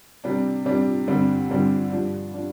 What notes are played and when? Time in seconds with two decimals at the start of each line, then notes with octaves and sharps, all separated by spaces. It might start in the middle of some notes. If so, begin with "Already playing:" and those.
0.24 C3 G3 D4
0.65 C3 G3 D4
1.08 G2 D3 G3 C4
1.50 G2 D3 G3 C4
1.91 G2 F3 D4
2.34 F3 D4